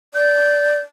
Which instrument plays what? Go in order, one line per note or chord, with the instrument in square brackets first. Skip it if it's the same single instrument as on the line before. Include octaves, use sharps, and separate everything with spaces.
[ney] D5 [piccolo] G6